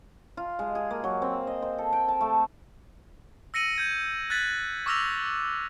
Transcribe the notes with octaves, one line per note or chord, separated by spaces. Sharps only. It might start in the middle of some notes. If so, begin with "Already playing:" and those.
F4
G#3
G#4
A#3
F#3
C4
D#5
C5
A4
G5
A5
A3
E6 A#6 C#7 D#7 F#7
G6 G#6 D#7
F#6 G#6 A6 B6 F#7
C#6 D6 E6 F6 A#6 F7